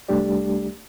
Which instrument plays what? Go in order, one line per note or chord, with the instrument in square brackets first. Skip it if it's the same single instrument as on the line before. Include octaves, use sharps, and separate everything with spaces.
[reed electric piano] C2 G3 A3 D4 G4 D5